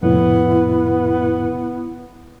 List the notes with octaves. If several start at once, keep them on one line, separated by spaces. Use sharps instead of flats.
F2 A2 C3 B3 E4